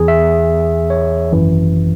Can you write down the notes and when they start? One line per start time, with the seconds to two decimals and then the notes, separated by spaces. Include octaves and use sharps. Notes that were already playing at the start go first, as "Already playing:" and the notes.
Already playing: E2 E3 G#4
0.08 E5
0.90 C#5
1.31 G#1 F#2 E3